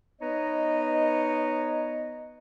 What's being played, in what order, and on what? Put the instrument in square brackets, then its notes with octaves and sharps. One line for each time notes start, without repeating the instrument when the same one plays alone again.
[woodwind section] B3 D#4 B4 C#5 D#5